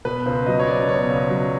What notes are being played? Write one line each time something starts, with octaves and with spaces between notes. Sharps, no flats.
B2 B4
C#2 C5
F#3 D#5
C#5
C#2 D5
B2 C#5
C#2
F#3